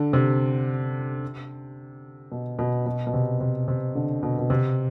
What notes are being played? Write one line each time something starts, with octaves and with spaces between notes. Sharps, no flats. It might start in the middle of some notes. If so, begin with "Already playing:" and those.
Already playing: D3
C3
B2
B2
B2
B2
C3
C3
C3
D3
B2
B2
C3